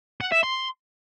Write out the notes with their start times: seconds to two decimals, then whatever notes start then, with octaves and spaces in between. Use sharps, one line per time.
0.21 F#5
0.32 E5
0.43 C6